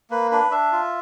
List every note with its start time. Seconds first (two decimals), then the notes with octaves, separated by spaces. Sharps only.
0.10 A#3 B4
0.31 D4 B4
0.51 D4 E5
0.72 F4